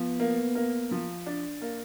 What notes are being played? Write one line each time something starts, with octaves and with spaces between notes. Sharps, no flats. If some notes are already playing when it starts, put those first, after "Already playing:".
Already playing: F3 B3
A#3
A#3
F3
D4
A#3